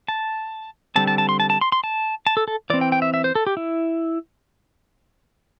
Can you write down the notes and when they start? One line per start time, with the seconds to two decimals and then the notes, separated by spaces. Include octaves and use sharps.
0.08 A5
0.96 D3 G3 C4 A5
1.07 A5
1.18 A5
1.29 C6
1.40 A5
1.50 A5
1.61 C6
1.72 C6
1.84 A5
2.27 A5
2.37 A4
2.48 A4
2.70 E3 D5
2.74 C4
2.81 G5
2.92 G5
3.02 E5
3.14 E5
3.24 C5
3.35 A4
3.47 G4
3.57 E4